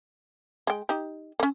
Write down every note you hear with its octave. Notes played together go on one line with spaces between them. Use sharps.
G#3 G5
D#4 G4
A#3 C#4